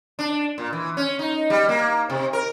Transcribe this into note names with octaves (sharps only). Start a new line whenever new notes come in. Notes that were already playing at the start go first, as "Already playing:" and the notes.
D4
A#2
E3
C#4
D#4
G3
A#3
C3
A#4